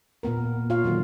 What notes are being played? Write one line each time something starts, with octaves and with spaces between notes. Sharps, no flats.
A#2 A#3 B3 A#4
F4 C#5 F5
D3 D#3 F#3 B3